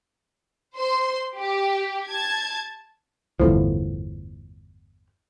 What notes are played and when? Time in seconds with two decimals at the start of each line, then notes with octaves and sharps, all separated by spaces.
0.77 C5 C6
1.37 G4
2.08 A5 G#6
3.40 G1 E2 A2 F3